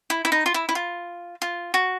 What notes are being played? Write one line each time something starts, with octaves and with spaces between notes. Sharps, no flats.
E4
E4
D#4
F4
E4
E4
F4
F4
F#4